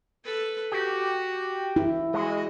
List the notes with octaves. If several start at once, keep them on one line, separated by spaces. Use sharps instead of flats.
A4 B4
F#4 G4
E4
G#3 F#4 D#5